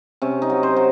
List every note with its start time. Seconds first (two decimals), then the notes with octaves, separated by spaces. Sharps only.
0.22 C3 C#4
0.42 D#4
0.50 F#3
0.63 C5
0.76 F#3